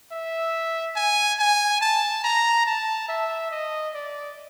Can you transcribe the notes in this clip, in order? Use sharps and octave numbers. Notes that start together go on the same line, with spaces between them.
E5
G#5
G#5
A5
A#5
A5
E5
D#5
D5